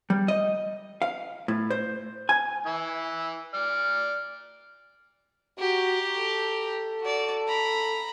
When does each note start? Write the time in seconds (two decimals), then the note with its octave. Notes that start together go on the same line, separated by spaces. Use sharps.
0.10 G3
0.28 D#5
1.02 F5
1.48 A2
1.70 C5
2.29 G#5
2.66 E3 E5 E6
3.54 D5 F6
5.59 F#4 G4 A#5
6.15 A4
7.01 F#4 D5
7.48 A#5 B5